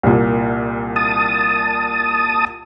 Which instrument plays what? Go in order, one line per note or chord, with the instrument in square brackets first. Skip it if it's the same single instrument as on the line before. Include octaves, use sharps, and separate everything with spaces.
[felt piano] C2 A#2
[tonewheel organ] A5 D#6